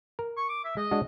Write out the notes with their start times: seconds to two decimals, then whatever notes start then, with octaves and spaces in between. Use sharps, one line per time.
0.19 A#4
0.37 C#6
0.49 D6
0.64 E5
0.77 G#3 D#5
0.91 G#3 D4 F#4